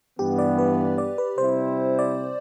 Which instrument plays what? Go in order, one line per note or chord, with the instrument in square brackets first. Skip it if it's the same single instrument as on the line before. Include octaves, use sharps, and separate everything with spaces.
[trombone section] G2 E3 B3 [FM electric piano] G4
[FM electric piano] D5
B4
D5
B4
[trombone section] C3 G3 C4 E4 [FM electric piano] C5
[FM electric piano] D5